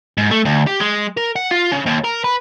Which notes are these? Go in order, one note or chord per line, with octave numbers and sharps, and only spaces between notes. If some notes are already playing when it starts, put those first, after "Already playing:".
G#2
A3
D2
G4
G#3
A#4
F#5
F4
C#3
D#2
A#4
B4